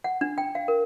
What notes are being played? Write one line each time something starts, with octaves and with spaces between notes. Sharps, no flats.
F#5
D4
G5
F5
A#4